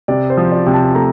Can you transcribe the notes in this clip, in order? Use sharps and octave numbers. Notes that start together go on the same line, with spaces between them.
C3 D5
C5
F3
D5
C3
A5
A3 A#5